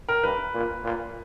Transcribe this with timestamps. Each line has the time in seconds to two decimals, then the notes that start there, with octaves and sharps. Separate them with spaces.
0.09 A#4
0.24 G2 B4
0.54 A#2
0.84 A#2